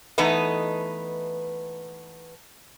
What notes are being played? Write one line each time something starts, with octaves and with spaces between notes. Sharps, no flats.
E3 A3 B3 D#4 B4 D#5